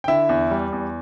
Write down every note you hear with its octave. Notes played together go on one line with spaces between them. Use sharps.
G5
D3 E4 E5
E2
G3
E2